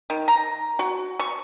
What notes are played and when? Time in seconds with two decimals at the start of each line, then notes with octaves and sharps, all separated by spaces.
0.10 D#3
0.28 A#5
0.79 F#4
1.20 C#6